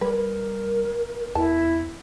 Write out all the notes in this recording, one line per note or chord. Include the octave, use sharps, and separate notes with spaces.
G3 A#4 B4
E2 E4 A5